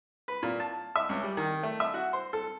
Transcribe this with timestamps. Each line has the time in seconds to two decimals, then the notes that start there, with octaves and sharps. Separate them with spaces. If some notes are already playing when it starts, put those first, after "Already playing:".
0.28 B4
0.43 A#2
0.60 A5
0.96 E5
1.09 C#2
1.23 G3
1.37 D#3
1.63 A3
1.80 E5
1.94 F#4
2.13 C5
2.33 A4